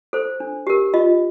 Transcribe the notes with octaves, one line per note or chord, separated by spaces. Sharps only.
A4 C5
D4
G4 A#4
F4 D#5